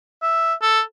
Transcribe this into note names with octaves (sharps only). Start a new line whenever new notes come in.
E5
A4